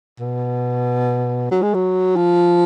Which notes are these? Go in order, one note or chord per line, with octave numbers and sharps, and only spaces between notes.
B2
F#3
G#3
F#3
F3